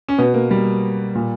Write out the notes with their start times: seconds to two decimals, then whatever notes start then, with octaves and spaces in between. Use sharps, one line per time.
0.09 C#4
0.18 B2 B3
0.34 A#3
0.51 G3
1.15 A#2